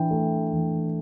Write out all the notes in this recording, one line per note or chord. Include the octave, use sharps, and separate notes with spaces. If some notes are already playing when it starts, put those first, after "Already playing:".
Already playing: E3 D4 G5
A3
E3